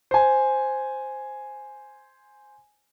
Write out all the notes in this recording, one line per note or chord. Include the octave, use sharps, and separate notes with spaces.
C5 G#5